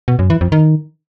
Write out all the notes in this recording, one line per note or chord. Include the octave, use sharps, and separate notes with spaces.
B2
F#2
E3
F2
D#3